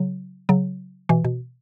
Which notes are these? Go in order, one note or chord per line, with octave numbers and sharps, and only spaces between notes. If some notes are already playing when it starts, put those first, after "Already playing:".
Already playing: C#3 F#3
C#3 F#3
B2 E3
B2